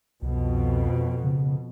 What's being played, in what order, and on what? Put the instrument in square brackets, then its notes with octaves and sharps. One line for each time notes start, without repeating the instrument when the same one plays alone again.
[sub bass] C2 [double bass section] F2 B2
[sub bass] C#3